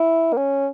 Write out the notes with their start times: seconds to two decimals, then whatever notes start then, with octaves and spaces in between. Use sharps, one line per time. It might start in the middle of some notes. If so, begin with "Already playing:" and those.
Already playing: E4
0.33 A#3
0.37 C#4